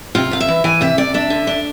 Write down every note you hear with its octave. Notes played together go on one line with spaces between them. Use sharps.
C3 F4
C3 F5
E5
E3
E3 G#5
C3 E5
C3 D5
D4 E5
D3
D4